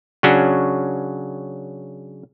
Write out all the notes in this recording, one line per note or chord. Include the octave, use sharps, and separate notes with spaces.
C#3 F#3 C#4 D4 F#4